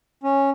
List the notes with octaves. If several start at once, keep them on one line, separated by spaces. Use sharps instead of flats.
C#4